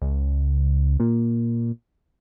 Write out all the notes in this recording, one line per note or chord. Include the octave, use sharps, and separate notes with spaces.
C#2
A#2